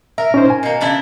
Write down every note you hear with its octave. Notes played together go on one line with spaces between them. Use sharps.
A#4 E5
C#4 D#4 C5
G#5
B2 A#3
C#3 D4 E4